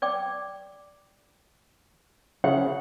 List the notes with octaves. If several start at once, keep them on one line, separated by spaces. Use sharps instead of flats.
D5 G5 D6
C#3 F#5